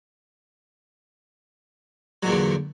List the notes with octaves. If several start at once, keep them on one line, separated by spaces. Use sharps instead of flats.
E2 A#2 D3 F#3